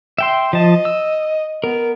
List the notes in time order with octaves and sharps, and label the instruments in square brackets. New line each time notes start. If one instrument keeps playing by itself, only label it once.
[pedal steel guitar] E5 G5 C6
[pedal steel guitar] F3 A5 [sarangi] D#5
[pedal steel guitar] E6
[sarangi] B3 [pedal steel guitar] A#4